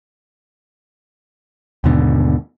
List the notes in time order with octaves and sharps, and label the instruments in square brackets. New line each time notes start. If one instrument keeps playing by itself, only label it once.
[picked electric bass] D#2 G#2 B2 D3